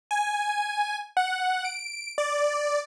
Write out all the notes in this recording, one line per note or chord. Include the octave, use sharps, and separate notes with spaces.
G#5
F#5
D7
D5